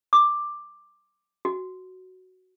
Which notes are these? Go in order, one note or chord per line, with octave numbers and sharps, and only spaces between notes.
D6
F#4